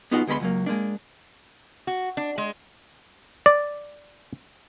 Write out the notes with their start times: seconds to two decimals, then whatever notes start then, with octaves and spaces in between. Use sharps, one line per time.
0.11 B3 D#4 F4 F#4 G#4 F#5
0.27 D2 G#3 B3 B5 C6
0.40 C#2 F#3 A#3
0.66 G#3 A#3 D4
1.87 F#4
2.17 D4
2.38 G#3
3.46 D5